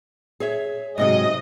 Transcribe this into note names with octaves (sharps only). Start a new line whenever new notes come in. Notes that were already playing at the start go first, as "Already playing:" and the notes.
G#4 C#5 E5
G#2 C3 F#3 D#5